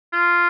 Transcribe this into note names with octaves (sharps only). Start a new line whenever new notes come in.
F4